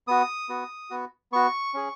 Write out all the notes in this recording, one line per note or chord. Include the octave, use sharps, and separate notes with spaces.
B3 F#4 D#6
B3 F#4
B3 F#4
B3 F#4 C#6
C#4 G#4